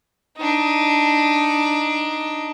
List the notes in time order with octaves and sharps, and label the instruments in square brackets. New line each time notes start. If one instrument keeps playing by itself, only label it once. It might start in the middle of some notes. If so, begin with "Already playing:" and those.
[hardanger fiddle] D4 D#4